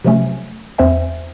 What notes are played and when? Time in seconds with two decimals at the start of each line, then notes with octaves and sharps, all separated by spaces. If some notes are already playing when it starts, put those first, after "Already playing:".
0.04 C3 F3 F#3 A3 C#4
0.78 E2 C4 C5 E5 G#5